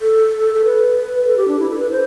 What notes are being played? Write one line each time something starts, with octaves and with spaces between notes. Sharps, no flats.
A4
A4
B4
A4
G4
D4
E4
A4
B4
C5